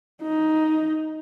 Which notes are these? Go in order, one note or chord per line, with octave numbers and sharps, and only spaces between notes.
D#4